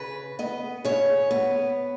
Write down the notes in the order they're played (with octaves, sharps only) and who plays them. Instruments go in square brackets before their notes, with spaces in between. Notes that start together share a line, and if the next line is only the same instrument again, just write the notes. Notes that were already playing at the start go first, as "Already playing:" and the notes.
Already playing: [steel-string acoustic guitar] C#3 B4
B3 D#5
C#3 C#5
B3